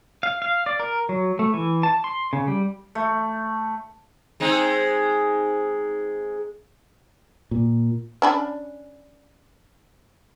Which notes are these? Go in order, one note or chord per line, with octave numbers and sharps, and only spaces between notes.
F5
F5
D5
A#4
F#3
A3
E3
A5
C6
C#3
G3
A3
G#3 C4 D#4
A#2
C#4 D4 B5